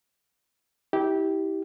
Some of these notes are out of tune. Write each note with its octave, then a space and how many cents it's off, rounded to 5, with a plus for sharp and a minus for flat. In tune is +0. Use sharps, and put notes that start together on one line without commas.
E4 -35 G4 -10